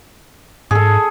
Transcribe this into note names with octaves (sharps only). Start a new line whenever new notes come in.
G#2 G#4 A4